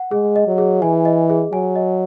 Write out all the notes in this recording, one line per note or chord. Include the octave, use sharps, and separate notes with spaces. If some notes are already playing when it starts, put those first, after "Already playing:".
Already playing: F#5
G#3 G#4
D#5
F#3
G#4
E3 G#5
D#5
G#4
F#3 G#5
D#5